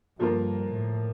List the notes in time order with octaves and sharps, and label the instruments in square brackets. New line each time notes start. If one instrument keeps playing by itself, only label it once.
[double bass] G2 [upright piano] D3 F3 A#3 F4 A#4
[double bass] A2